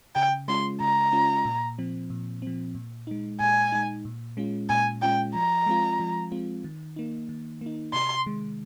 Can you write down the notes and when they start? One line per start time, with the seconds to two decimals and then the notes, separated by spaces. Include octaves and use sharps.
0.15 C#3 G5
0.48 G#3 C#4 F4 C6
0.81 C#3 A#5
1.13 G#3 C#4 F4
1.45 A#2
1.78 F3 C4
2.10 A#2
2.42 F3 C4
2.75 A#2
3.07 G#3 D#4
3.40 A#2 G#5
3.72 G#3 D#4
4.05 A#2
4.37 G#3 C#4 F4
4.69 A#2 G#5
5.02 G#3 C#4 F4 G5
5.35 F3 A#5
5.66 G#3 C4 F4
6.00 F3
6.32 G#3 C4 F4
6.64 D#3
6.96 A#3 D#4
7.29 D#3
7.61 A#3 D#4
7.93 C3 C6
8.26 D#3 G#3